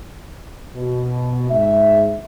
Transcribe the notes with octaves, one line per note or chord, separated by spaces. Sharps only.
B2
G#2 E5